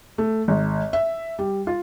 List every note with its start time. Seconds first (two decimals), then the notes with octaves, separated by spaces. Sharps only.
0.18 A3
0.48 G#1
0.93 E5
1.39 G3
1.67 F4